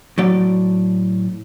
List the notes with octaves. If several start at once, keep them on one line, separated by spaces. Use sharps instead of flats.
A2 F#3 D5